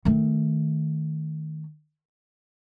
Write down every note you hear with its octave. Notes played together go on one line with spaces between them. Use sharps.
D#3 A3